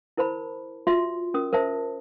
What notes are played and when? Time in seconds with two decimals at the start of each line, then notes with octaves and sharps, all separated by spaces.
0.17 E4 A#4 C5 A5 B5
0.87 F4 F#4 E5 C6
1.34 C#4 A#4 D#6
1.53 A#4 C5 E5 A5